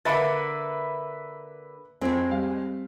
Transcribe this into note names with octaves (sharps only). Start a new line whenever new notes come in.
D3 A#3 B4 E5 B5 A6 C#7 D7
F2 A2 G#3 C4
G3 F5